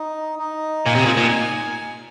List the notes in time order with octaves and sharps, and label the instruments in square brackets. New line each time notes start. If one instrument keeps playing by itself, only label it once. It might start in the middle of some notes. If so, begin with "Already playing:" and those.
Already playing: [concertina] D#4
D#4
[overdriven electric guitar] A#2 [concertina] G#5
[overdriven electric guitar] C3
A#2
A#2